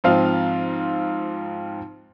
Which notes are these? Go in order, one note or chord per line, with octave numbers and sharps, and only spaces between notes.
G#2 F3 C4 F4 F5